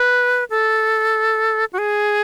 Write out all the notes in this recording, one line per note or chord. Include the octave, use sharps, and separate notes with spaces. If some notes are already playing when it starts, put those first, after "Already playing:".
Already playing: B4
A4
F#4
G#4